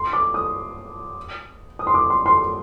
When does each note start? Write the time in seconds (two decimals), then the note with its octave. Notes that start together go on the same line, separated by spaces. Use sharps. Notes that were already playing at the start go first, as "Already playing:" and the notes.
Already playing: C6
0.13 D6
0.34 D#6
1.79 D#6
1.87 C6
1.94 D6
2.10 C6
2.26 C6